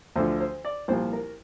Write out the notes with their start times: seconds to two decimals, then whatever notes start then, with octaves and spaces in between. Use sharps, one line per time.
0.16 D2 D3 F3 C5
0.40 C5
0.65 D5
0.88 C2 A#2 F3 C5
1.13 A#4